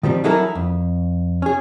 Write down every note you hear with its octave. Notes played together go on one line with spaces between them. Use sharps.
D#3 F3 G3 C4
E3 F#3 D#4 E4 A4 A#4
F2
C#4 G#4